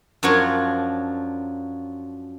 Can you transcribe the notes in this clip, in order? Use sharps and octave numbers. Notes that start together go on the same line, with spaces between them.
F#2 F3 F#3 D4 F4 C#5